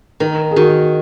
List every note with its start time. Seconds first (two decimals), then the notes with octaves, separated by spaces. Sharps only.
0.20 D#3 A#4
0.51 G#4
0.56 D#3 F#4